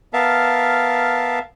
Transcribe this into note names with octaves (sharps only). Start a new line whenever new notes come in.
B3 A#4 E5 F5 A5